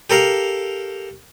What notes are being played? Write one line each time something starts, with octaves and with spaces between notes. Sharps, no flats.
G4 A4 A#4 F5